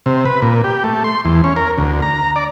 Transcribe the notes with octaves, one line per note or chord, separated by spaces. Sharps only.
C3
B4
A#2
G4
A3
C6
E2
C#4
A#4
D2
A#5
D5